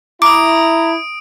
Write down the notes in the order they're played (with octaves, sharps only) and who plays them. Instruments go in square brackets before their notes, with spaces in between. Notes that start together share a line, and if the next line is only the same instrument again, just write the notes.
[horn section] E4 [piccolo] A#5 [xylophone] D6 [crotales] D#6 D7